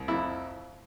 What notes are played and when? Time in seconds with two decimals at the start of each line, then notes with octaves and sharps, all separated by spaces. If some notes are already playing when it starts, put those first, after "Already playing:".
Already playing: C2
0.08 F2 E4